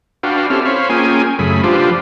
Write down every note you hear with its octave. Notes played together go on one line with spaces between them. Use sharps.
D4 F#4 B4 F5 G5
C4 C#4 E4 G4 A4 F6
C5 C#5 F5 B5
A#3 C#4 F4 G#4 G5 G#5
F#2 C#3 A3 G#4 B5
F3 D4 F4 G4 B4 C5